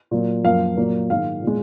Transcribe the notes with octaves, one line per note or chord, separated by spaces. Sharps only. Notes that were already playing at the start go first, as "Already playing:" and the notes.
A#2 F#3 A#3
F#2 F3 A#3 F5
A#2 F#3 A#3
G#2 D#3 G#3 F5
A#2 G#3